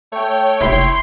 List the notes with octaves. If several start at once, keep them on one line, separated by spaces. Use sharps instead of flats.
A3 C#5 G5
F1 E4 C6